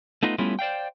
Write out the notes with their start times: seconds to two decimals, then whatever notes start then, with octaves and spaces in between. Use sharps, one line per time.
0.23 A3 B3 D#4 F4 B4 D#5
0.38 G3 A3 B3 C#4 E4 F4
0.59 C5 D5 F5 G5